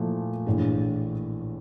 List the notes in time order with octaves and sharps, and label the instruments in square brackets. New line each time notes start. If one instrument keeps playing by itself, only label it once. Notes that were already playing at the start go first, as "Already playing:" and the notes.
Already playing: [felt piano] A#2 F3 A3 E4
A#1 A2 E3